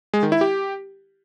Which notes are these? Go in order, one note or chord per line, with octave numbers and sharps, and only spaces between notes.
G#3
D#3
E4
G4